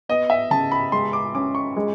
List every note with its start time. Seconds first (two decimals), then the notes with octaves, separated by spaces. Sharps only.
0.09 B3 D#5
0.30 E5
0.50 C#3 A5
0.71 B5
0.92 G#3 C6
1.13 D6
1.35 C#4 D6
1.55 C#6
1.76 G#3